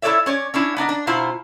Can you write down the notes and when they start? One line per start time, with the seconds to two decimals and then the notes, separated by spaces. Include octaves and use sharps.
0.02 E4 A4 B4 C#5 D5 E5
0.26 C#4 C#5 D5
0.54 C#4 D4 E4
0.77 B3 D4 D#4 D#5
0.89 D4
1.07 B2 E4 F4 C5 A#5